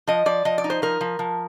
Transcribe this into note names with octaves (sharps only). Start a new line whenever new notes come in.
F3 D#5
F3 D5
F3 D#5
D5
D#4
C5
F3 A#4
F3
F3